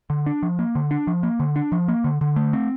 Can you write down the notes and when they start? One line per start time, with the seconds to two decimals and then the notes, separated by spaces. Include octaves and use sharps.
0.10 D3
0.26 D4
0.42 F3
0.59 A#3
0.75 D3
0.91 D4
1.07 F3
1.23 A#3
1.40 D3
1.56 D4
1.72 F3
1.88 A#3
2.04 D3
2.21 D3
2.36 A3
2.53 C4